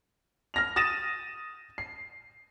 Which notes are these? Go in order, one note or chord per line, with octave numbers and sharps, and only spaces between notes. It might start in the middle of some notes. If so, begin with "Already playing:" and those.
F6 A#6 F7
D#6 A6 A#6 D#7 E7
C7